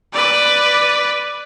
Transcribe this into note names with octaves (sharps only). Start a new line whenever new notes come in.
B4 D5